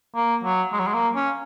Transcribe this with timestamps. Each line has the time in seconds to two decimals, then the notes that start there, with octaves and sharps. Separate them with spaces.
0.15 A#3
0.43 F#3
0.72 G#3
0.79 F#3
0.86 G#3
0.94 A#3
1.16 C#4